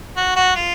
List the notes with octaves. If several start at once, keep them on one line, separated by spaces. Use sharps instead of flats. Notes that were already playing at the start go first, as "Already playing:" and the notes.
F#4
F#4
F4